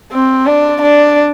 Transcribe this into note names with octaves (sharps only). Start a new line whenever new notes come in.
C4
D4
D4